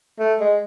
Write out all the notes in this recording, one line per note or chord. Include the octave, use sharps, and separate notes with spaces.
A3
G#3